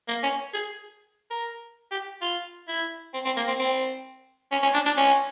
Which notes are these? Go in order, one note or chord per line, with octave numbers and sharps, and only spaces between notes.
A#3
C#4
G#4
A#4
G4
F4
E4
C4
C4
A#3
C4
C4
C#4
C#4
D4
D4
C#4